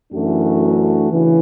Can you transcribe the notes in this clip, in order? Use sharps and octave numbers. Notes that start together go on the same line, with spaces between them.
F#2 E3 A3 D4 F#4
C#3 E3